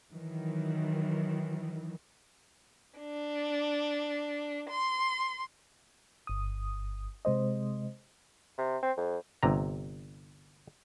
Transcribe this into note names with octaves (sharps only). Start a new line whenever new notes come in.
D#3 E3 F#3
D4
C6
G1 D#6
C3 G#3 C5 D#5
C3
C4
F2
G1 C3 A#5